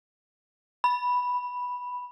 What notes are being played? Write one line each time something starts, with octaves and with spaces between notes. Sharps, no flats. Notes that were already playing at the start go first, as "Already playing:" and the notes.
B5